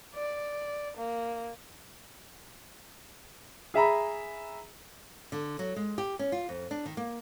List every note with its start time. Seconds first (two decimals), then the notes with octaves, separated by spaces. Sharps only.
0.15 D5
0.97 A#3
3.74 G#4 E5 A#5 B5
5.32 D3
5.59 F#3
5.76 G#3
5.98 G4
6.19 C#4
6.32 F4
6.49 F2
6.71 D4
6.85 D#3
6.97 A#3